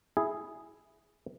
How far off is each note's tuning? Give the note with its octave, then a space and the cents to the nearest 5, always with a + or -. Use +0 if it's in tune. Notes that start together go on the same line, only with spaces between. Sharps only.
E4 +0 G#4 +0